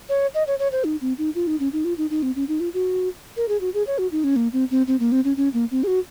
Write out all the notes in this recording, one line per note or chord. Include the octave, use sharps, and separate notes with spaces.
C#5
D#5
C#5
C#5
C5
D#4
C4
D#4
F4
D#4
C#4
D#4
F4
D#4
D#4
C4
C#4
D#4
F4
F#4
A#4
G#4
F#4
G#4
C#5
F#4
D#4
C#4
A#3
C4
C4
C4
A#3
C4
C#4
C#4
A#3
C4
G#4
F#4